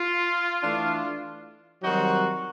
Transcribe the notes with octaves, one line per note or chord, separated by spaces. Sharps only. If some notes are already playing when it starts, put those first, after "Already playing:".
Already playing: F4
E3 A3 D4
D#3 F#3 G3 C4 D#4 F#4